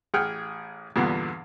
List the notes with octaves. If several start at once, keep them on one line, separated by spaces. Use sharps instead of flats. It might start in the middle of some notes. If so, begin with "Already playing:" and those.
A1 G#4 F#5 G5 F6
E2 G2 A#2 D3 B3